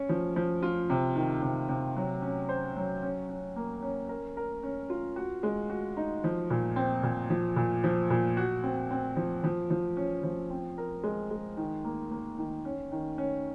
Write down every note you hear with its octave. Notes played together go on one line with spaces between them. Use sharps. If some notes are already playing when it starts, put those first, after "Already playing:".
Already playing: C#4
F3
F3
F4
C3
D#3
C3
C3
F#3
C#4
C5
F#3
C#4
C#4
A#3
C#4
A#4
A#4
C#4
F4
F#4
G#3
F#4
D#4
F3
A#2
C4
A#2
F3
A#2
F3
A#2
F#4
C4
C4
F3
F3
F3
C#4
F3
C4
A#4
G#3
G#3
D#3
A#3
A#3
D#3
C#4
D#3
C#4